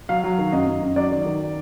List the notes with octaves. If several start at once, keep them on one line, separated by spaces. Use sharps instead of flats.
F#3 F5
F#3
D#3
F#2 D#5
F#2
F#2
F#3 D5
D#3
D#3